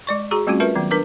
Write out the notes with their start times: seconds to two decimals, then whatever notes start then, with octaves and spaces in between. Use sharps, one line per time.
0.07 G#3 D5 C#6
0.31 F#4 G#4 A#5 C#6
0.47 G3 A3 C4 C#4 F4 F#4
0.60 F4 A#4 B4 E5 A5
0.75 D#3 F#3 B3
0.91 D4 A#4 B4 D6